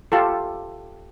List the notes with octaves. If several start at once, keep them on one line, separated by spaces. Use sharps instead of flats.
F4 G4 A4